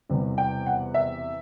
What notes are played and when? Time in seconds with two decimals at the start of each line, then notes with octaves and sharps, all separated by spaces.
0.09 E1 E2 C3 E3 G3
0.38 G5
0.66 F#5
0.94 E5